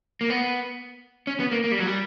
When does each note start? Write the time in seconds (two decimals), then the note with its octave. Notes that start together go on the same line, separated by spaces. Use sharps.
0.21 A#3
0.30 B3
1.27 C#4
1.40 B3
1.52 A#3
1.64 A#3
1.72 G3
1.80 F#3
1.87 G3